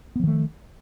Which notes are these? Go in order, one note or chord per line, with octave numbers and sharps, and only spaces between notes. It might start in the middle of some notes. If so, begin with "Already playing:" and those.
D#3 F3 A3 B3